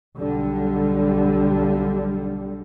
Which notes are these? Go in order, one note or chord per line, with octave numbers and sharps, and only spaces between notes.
B1 D3 G3